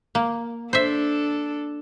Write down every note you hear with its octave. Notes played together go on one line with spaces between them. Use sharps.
A#3
D4 A4 C5 E5